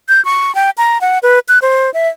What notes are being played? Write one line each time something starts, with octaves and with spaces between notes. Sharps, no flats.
G6
C#6
G5
A#5
F#5
B4
F#6
C5
E5